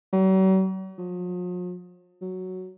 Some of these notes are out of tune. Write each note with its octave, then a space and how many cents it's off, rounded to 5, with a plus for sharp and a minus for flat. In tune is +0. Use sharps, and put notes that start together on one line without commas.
F#3 +45
F3 +45
F#3 +0